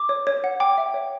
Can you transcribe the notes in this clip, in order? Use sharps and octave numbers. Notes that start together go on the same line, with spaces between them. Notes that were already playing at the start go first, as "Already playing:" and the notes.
Already playing: D6
C#5
C#5
F#5
G5 D6
E5
C#5